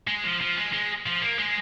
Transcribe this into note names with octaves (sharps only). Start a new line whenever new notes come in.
G#3
F3
F3
G#3
G#3
F3
A#3
G#3